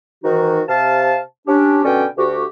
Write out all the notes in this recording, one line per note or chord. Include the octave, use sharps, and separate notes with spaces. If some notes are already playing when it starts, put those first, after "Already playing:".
G#2 D#3 E3 D#4 F#4
C3 F5 A5
C#4 D4 G4
B2 D3 C#4 F#4 D5 G5
D2 F#4 G4